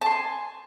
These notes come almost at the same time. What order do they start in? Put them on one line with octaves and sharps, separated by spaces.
A5 C6 G#5